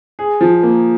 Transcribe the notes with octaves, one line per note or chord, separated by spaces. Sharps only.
G#4
F3
A#3